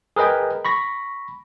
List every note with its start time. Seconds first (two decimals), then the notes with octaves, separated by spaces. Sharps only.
0.16 G#4 A#4 B4 D#5 G5
0.65 B5 C#6 A#6